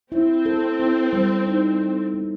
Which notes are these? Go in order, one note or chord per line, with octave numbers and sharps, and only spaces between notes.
C4 E4
A4
E4
G3
D#4
A4
B3